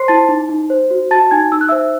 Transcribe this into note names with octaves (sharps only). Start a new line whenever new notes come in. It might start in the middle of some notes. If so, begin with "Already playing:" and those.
Already playing: C5 C6 C7
E4 A5 A6
D#4
D#4
C5
F#4
F#4 A5 A6
D#4 G#5 G#6
D#4 E6
F#6
C5 E5 E6